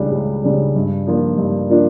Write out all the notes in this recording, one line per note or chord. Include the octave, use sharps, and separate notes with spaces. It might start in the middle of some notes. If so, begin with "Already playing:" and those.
Already playing: C#2 C#3 G3 D4
C#2
C#3 G3 D4
G2
F3 A#3 D4 F4
G2
F3 A#3 D4 F4